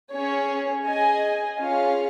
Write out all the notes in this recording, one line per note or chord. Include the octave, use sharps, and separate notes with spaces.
C#4 G#4 C#5
G#4 D#5 G#5
C#4 F4 G#4 C#5 F5